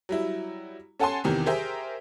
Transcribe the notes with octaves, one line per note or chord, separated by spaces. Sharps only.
F#3 G3 E4
C#4 A4 F#5 G#5 A5 C6
E2 C3 D#3 E3
G4 G#4 A#4 C5 E5 G5